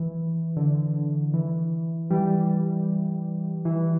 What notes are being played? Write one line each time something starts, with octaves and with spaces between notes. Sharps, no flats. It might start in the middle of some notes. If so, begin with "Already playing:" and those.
Already playing: E3
D3
E3
E3 G3
E3